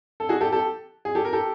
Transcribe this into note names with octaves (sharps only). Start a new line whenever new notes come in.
A4
F#4 G#4
G4 A4
G4 A4
G#4
G4 A4
A#4
G4 A4